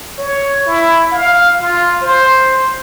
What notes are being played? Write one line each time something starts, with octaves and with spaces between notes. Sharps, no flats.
C#5
E4
F5
F4
C5